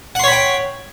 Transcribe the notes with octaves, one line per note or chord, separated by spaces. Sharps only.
C#5 F#5 G5 B5 C6